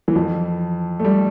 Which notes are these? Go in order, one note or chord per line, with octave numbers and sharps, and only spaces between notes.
E3
F2 F3
A3
G3